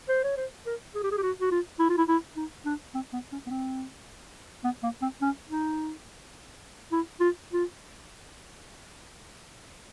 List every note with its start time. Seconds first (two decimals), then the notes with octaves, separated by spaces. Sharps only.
0.09 C5
0.24 C#5
0.37 C5
0.66 A#4
0.95 G#4
1.03 G4
1.12 G#4
1.18 G4
1.23 F#4
1.41 F#4
1.51 F4
1.79 E4
1.89 F4
1.98 E4
2.08 E4
2.36 D#4
2.66 D4
2.94 C4
3.13 B3
3.32 C#4
3.47 B3
3.50 C4
4.64 B3
4.83 A#3
5.02 C4
5.22 C#4
5.50 D#4
6.92 E4
7.21 F4
7.53 F4